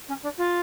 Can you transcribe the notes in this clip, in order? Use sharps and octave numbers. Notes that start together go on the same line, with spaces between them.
C#4
D4
F4